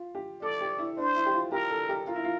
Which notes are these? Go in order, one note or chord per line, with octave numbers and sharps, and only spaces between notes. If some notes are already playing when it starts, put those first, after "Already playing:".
Already playing: F4
G4
A4 D5
G4
E4
D4 C5
E4
G4
F4
G4 A#4
A4
G4
F4 A#4
E4
F4